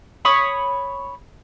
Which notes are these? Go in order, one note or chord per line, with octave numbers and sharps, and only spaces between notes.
C#5 B5 D#6